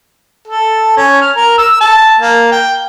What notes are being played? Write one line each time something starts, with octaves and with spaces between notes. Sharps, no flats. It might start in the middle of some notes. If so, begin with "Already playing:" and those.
A4
C#4
F6
A#4
E6
A5
A#3
G5